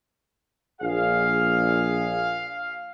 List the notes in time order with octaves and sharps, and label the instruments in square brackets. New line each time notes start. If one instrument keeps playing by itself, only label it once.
[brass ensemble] A#1 G#4 [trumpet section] F5